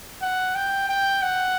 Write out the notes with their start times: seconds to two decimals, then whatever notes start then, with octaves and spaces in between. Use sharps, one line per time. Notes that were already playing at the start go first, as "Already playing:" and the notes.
0.22 F#5
0.55 G5
0.89 G5
1.22 F#5